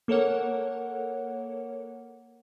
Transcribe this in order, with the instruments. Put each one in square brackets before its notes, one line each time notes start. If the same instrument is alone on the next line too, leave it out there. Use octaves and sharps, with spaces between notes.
[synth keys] A#3 A4 A#4 C#5 F#5